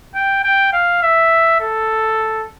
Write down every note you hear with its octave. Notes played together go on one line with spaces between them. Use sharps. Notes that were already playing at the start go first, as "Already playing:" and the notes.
G5
G5
F5
E5
A4